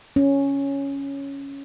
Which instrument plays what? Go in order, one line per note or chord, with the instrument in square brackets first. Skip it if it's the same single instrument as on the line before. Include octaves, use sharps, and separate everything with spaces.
[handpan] C#4